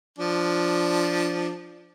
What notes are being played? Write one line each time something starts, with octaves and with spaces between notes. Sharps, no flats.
F3 D4